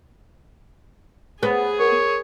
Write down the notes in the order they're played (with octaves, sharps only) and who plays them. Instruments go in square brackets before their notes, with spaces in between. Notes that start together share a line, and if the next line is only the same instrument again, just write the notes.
[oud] B3 [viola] G#4
[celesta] A#4 [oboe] C#5